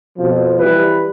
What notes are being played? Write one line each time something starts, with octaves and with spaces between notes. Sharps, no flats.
F2 B2 F3
E3 G3 B4